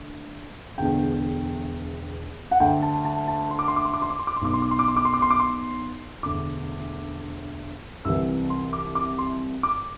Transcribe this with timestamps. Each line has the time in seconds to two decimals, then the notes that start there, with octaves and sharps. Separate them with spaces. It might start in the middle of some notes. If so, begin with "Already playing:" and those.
Already playing: D2
0.78 E1 E2 D3 G5
2.51 F#5
2.60 D2 D3 G5
2.82 A5
3.05 A5
3.28 A5
3.51 C6
3.59 D6
3.68 C6
3.76 D6
3.85 C6
3.94 D6
4.02 C6
4.10 D6
4.19 C6
4.27 D6
4.37 C6
4.41 B1 B2 D6
4.54 C6
4.62 D6
4.71 C6
4.79 D6
4.88 C6
4.97 D6
5.05 C6
5.14 D6
5.22 C6
5.30 D6
5.39 C6
6.23 E1 D2 D3 D6
8.05 C2 C3 E3 E6
8.50 C6
8.73 D6
8.95 D6
9.18 C6
9.63 D6